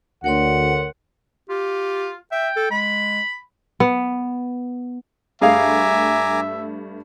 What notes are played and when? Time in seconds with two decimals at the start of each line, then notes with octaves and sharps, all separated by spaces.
0.24 D2 A#4 C#5 F#5 C6
1.49 F4 G4
2.32 E5 G5
2.56 A4
2.71 G#3 B5
3.80 B3
5.42 G2 A3 G#4 E5 F5 G#5 A#5 D6